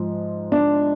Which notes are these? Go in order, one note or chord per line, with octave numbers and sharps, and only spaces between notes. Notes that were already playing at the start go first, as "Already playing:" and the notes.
Already playing: G#2 F3
D4